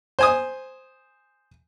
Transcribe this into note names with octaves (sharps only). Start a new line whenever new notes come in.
C5 G#5 D#6